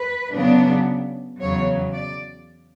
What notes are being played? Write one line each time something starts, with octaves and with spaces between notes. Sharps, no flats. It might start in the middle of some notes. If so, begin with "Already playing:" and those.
Already playing: B4
C#3 F#3 B3 D4
E2 C#3 F#3 C#5
D5